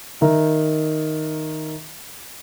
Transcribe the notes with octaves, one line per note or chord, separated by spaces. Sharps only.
D#3 E5 A#5